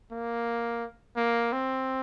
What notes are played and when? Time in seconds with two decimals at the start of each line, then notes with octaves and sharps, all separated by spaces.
0.12 A#3
1.17 A#3
1.52 C4